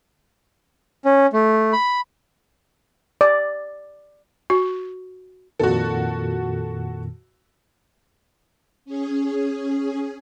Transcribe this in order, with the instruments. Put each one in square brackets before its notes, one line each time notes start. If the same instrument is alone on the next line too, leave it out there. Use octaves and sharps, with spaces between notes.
[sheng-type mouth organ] C#4
A3
B5
[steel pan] D5
[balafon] F#4
[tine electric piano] F2 A#2 D#3 [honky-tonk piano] F#4 A4
[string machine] C#4 G#4